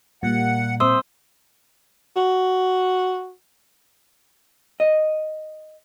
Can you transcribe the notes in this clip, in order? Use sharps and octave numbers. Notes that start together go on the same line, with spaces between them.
A#2 G3 A#3 F#5
C4 C5 E5 C6 D#6 E6
F#4
D#5